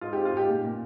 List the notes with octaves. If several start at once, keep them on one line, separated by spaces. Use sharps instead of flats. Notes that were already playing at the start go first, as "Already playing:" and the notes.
G#2 F4
C4 G4
F4
G#2 G4
A#2
A#2